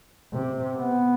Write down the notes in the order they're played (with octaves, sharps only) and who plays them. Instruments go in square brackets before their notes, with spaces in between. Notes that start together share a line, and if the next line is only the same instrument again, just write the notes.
[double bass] C3
B3